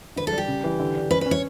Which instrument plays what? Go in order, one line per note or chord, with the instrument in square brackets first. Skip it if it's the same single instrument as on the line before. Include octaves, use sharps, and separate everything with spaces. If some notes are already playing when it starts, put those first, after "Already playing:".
[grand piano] D3 [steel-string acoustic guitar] B4
[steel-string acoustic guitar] A4
[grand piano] G3
[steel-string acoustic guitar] G4
[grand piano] C#3
E3
D3
D4
[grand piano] C#4 [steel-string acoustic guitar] B4
[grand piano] C#4 [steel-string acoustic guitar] B4
[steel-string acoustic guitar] C#5